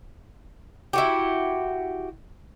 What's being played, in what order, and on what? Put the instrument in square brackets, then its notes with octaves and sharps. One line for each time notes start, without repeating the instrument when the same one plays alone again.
[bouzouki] E4 F#4 G4